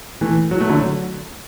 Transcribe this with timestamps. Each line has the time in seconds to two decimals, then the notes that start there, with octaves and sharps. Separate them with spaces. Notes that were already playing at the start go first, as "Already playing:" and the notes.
0.21 E3 A3
0.51 F#3
0.60 A3
0.70 D3 F#3